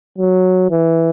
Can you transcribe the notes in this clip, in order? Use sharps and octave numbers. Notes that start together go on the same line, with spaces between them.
F#3
E3